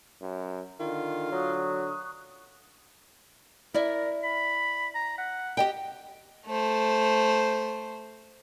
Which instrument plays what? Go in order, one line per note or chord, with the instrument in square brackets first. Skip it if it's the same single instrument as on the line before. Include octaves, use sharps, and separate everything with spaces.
[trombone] F#2
[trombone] D3 [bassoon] D#3 [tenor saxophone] F4
[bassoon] F#3 [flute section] C#6 D#6 F#6
[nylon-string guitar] E4 D5 E5 [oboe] A#4
[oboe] B5
A#5
F#5
[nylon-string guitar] G4 D#5 G5
[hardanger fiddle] A3 C5